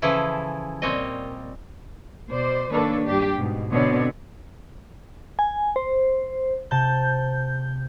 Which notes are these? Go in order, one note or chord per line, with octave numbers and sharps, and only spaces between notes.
C#3 E3 F3 E4 G#4 A4
A#2 G3 C4 C#5 D#5
B2 C5 D5
D#3 A#3 D4 A4 B4 C#5
G2 D4 G4
G#2 B2
B2 D3 B3 C4 C#5 D5
G#5
C5
C3 A5 G6